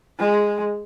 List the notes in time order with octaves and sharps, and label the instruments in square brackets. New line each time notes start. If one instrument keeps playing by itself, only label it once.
[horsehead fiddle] G#3